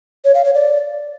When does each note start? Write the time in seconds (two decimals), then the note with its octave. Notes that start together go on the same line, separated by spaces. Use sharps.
0.25 C#5
0.35 F5
0.45 C#5
0.55 D5